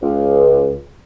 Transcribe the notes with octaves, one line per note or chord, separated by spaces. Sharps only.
C#2